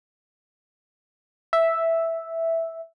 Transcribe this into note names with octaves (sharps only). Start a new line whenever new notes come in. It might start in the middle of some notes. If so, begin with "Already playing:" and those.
E5